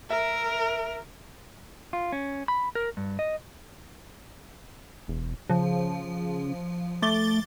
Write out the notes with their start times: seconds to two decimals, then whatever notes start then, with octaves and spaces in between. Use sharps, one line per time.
0.10 A#4 E5
1.93 F4
2.12 C#4
2.48 B5
2.75 A#4
2.97 G2
3.19 D#5
5.08 E1
5.50 C#3 F3
7.02 A3 D6 A6 G7